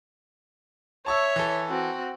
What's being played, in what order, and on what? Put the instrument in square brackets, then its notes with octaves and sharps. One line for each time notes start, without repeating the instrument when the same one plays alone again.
[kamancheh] C#5 E5 [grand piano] A5 C#6 E6
[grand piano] E3 A4
[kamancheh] C4 F#4